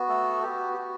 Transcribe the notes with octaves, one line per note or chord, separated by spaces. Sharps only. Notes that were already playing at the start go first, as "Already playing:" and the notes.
Already playing: B3 F#4
A3 A4
B3 F#4 G4
G4
F#4